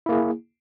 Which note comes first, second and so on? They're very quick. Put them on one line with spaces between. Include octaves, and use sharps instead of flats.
E4 A#3 G#4